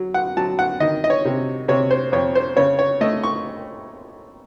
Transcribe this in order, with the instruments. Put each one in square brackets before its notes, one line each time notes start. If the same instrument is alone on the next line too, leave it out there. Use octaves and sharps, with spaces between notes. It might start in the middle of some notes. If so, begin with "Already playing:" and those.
Already playing: [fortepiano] F#3
F#5
F#3 A5
F#5
D#3 D#5
D#5
C#5
C3
C3 C#5
C5
F2 C#5
C5
C#3 C#5
C#5
A3 D#5
C#6